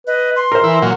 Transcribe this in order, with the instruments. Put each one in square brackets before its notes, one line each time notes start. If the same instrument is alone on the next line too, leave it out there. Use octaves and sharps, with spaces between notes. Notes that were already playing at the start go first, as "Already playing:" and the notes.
[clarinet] B4 [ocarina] D#5
[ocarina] C6
[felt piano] A#4 C5
[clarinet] E3 [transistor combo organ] E4
[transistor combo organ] A#2 F#3